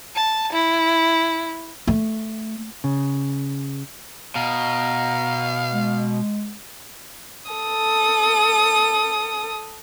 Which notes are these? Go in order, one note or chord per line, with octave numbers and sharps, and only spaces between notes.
A5
E4
A3
C#3
B2 F5 A#5
G#3
A4 D#6